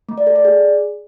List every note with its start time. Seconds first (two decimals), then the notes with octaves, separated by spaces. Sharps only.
0.09 A3
0.18 D5
0.27 A4
0.36 D5
0.45 G#4